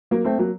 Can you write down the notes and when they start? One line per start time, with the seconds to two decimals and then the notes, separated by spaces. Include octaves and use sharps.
0.11 F#3 A#3
0.25 A3 C4
0.38 F#3 A#3